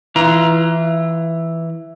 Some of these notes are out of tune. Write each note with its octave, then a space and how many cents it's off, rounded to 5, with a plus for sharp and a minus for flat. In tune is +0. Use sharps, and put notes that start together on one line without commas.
E3 +0 F4 -20 A#5 +20